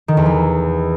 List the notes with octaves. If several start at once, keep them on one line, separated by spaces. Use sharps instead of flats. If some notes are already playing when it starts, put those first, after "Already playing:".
D#3
E2
E3